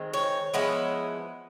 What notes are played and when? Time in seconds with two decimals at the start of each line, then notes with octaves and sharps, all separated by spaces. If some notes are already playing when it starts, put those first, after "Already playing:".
Already playing: D#3 G#3 C4
0.14 C#5
0.54 F3 G#3 B3 E4